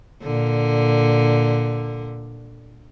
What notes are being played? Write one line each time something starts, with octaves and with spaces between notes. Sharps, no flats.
A#2 D3